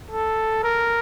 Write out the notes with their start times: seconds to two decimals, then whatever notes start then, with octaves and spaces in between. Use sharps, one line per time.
0.10 A4
0.63 A#4